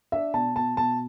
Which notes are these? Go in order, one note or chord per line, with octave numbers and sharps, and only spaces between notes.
D4 E5
B2 A5
B2 A5
B2 A5